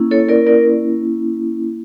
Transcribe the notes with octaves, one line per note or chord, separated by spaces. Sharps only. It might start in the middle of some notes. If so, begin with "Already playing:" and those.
Already playing: A#3 C#4 E4
A4 C#5
A#4 D5
A#4 D5